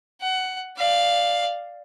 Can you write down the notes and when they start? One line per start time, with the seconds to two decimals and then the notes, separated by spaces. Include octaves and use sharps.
0.21 F#5
0.77 D5 F5